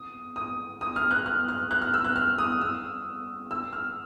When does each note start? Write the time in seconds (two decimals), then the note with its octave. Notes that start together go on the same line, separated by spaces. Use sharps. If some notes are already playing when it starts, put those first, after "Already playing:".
Already playing: D#6
0.36 D#6
0.81 D#6
0.96 F6
1.11 F#6
1.26 F6
1.48 F6
1.71 F#6
1.82 F6
1.94 E6
2.04 F#6
2.16 F6
2.38 D#6
2.61 E6
3.51 E6
3.73 F6